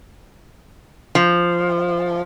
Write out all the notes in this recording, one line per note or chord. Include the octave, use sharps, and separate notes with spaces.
F3